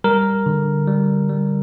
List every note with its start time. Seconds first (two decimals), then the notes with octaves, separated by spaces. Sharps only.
0.04 G3 A#4
0.46 D3
0.88 G3
1.29 G3